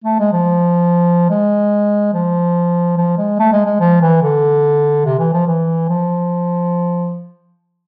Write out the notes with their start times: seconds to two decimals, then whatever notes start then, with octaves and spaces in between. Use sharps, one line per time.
0.04 A3
0.19 G#3
0.32 F3
1.30 G#3
2.14 F3
2.97 F3
3.18 G#3
3.39 A3
3.52 G#3
3.66 G#3
3.80 F3
4.02 E3
4.22 D3
5.05 C3
5.19 E3
5.33 F3
5.47 E3
5.88 F3